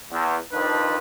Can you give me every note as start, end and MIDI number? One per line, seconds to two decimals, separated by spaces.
0.11 0.36 40
0.52 0.97 41
0.52 0.97 51
0.52 0.97 53
0.52 0.97 62
0.52 0.97 71